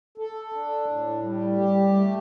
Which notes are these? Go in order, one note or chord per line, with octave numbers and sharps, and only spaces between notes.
A4
D4
A2
G3
G4
A3